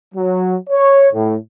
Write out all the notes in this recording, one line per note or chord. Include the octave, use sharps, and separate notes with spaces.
F#3
C#5
A2